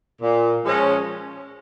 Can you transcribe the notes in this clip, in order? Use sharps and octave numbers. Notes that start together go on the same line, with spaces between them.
A#2
F3 G#3 C#4